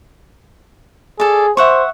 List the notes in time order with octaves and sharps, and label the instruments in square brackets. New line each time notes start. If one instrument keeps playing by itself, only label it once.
[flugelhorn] G#4 [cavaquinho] A4 D5
[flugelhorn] C5 [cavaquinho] E5 F#5 C#6